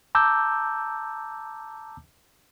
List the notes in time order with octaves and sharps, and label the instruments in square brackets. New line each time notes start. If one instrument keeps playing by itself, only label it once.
[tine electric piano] A5 A#5 D6 E6 G6